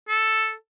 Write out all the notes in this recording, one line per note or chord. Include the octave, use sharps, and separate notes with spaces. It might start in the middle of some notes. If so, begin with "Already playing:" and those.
A4